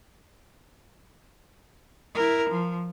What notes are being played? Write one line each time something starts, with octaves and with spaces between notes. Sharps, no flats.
E4 A#4
F3